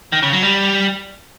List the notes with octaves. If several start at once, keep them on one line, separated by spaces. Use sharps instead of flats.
D#3
C#3
F#3
G3